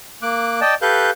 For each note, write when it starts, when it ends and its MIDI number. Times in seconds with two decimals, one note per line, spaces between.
0.22 0.60 58
0.22 0.60 86
0.22 0.60 90
0.61 0.75 74
0.61 0.75 75
0.61 0.75 79
0.61 0.75 81
0.82 1.11 67
0.82 1.11 69
0.82 1.11 71
0.82 1.11 77
0.82 1.11 90
0.82 1.11 91